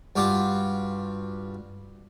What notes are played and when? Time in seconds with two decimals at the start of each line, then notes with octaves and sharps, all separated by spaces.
0.16 G2 F4 F#4 D6